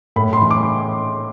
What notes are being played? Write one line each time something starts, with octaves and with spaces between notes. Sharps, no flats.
A2 B5
C6
E3
D6